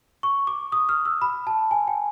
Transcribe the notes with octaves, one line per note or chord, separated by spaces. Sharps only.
C#6
D6
D#6
F6
E6
B5
A5
G#5
G5